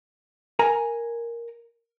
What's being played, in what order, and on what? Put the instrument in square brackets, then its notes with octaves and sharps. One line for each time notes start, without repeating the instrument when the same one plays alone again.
[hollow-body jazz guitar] A#4 G#5 A#5